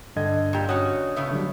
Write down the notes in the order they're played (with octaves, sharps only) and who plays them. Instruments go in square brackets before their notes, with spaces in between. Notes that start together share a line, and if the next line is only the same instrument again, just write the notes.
[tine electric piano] G2 [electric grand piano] D3 D#5 G#6
[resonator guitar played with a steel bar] A#2 G4
[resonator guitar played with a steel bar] C#4 F#4 [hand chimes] C#5 D#6 F#6
[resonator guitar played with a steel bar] A2 C#3 B3 [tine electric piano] E5
[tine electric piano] D3 F#3 G3